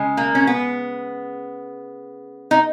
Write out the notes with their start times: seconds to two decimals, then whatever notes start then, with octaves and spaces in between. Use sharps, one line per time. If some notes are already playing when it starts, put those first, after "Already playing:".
Already playing: C#3 G#3
0.17 A#3
0.35 C#4
0.47 B3
2.51 D#4